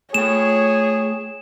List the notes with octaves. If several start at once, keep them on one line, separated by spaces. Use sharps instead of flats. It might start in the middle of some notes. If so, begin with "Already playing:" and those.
A3 G#4 C#5 G5 E7